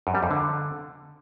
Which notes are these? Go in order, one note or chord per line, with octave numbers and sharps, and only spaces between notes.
F#2
G3
F2
D3